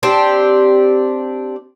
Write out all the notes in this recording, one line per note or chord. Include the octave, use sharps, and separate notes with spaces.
C4 D4 G4